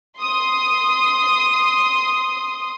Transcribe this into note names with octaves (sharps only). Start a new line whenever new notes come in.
C6 D#6